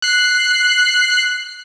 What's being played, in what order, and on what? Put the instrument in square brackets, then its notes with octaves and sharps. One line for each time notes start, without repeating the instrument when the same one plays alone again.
[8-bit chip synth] F#6 C7